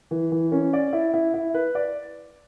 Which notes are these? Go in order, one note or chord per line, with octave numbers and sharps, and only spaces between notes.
E3
E3
C#4
D5
E4
E4
E4
B4
D5